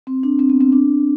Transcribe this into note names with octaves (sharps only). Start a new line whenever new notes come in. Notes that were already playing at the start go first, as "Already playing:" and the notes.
C4
D4
C4
B3
C4
D4